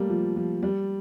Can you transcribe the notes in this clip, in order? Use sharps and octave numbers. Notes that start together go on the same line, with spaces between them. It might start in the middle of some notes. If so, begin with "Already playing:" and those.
Already playing: G3 A3 A#3
F3
F3
G3